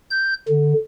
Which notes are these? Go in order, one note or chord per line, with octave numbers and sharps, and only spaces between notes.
G6
D3